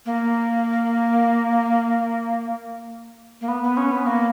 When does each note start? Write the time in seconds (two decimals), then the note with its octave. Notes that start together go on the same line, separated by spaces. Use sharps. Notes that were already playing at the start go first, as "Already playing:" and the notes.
0.06 A#3
3.41 A#3
3.48 B3
3.63 B3
3.77 C#4
3.92 B3
4.06 A#3